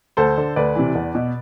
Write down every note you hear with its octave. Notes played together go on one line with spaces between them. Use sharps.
D2 A4 C5
D3
D2 B4 D5
C3 E3
E2
B2